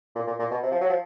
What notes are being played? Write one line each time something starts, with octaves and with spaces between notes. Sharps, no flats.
A#2
A#2
A#2
B2
C3
F3
F#3
F3